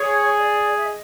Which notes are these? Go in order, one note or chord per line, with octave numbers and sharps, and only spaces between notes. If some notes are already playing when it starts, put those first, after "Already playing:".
Already playing: G#4 C#5
D5
E5
D#5